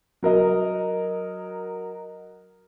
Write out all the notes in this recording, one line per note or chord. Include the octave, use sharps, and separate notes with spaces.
F#3 A#4 D#5